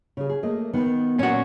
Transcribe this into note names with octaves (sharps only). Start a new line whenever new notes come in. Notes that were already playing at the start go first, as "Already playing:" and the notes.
C#3 G#4
G#4
A3 A#3 D#5
D#3 B3
A#2 C#4 F#4